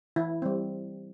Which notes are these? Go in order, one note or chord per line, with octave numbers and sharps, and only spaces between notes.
E3 E4
G3 C4